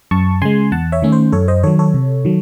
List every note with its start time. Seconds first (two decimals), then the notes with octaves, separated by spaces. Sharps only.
0.11 F#2 A5 C#6
0.42 C#3 G#3 G#5 C6
0.72 E2 F#5 A5
0.92 C#5 E5
1.02 D#3 A3 C#4
1.12 C5
1.32 F#2 A4 C#5
1.48 C5 D#5
1.63 D#3 F#3 A4 C#5
1.79 A4 C#5
1.94 C3
2.25 D#3 F#3